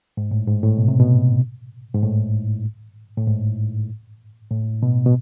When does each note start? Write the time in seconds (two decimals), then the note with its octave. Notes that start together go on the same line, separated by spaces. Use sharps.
0.17 G#2
0.31 A2
0.47 G#2
0.63 A2
0.78 B2
0.88 C3
0.99 B2
1.95 G#2
2.03 A2
3.17 A2
3.27 G#2
4.51 A2
4.83 B2
5.06 B2